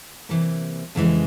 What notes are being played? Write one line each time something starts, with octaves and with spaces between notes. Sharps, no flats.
C3 E3 G3 A#3
F2 C#3 E3 G#3